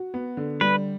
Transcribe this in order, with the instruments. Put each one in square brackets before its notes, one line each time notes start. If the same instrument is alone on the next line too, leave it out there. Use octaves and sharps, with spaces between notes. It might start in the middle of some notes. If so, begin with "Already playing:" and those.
Already playing: [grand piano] F#4
B3
D3
[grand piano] G3 [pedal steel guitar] B4